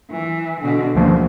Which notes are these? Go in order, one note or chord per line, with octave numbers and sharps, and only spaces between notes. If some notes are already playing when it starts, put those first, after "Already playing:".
E3
B2 D3
D2 F3 A#3